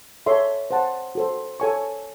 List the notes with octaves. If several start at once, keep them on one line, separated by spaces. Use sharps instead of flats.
A4 C#5 E5 C6
C5 F#5 A5
F#4 A4 C5
A4 C#5 G#5 C#6